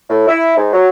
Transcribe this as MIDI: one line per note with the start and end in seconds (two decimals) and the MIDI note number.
0.09 0.25 45
0.27 0.53 64
0.56 0.71 44
0.73 0.88 54